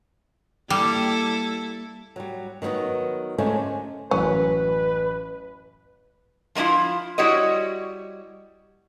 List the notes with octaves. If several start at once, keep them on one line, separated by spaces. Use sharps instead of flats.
G3 A#3 E4 A4
F#3 G3
D#3 F#3 G3 B3 D#4
D3 D#3 G#3 A3 C#4 C5
A1 F#2 C#4 B4
F3 G#3 A#3 E4 F4
G3 E4 F#4 C#5 D#5